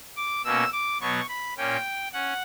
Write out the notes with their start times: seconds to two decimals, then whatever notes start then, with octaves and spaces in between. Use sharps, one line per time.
0.16 D6
0.44 B2 A#3 C#4 E6
0.72 D6
1.00 B2 F#3 B3 C#6
1.29 B5
1.57 A#2 A#3 C#4 G5
2.13 C#4 F#5